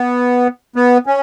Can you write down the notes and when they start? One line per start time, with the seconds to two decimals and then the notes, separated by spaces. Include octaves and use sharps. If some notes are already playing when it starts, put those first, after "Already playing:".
Already playing: B3
0.76 B3
1.06 C#4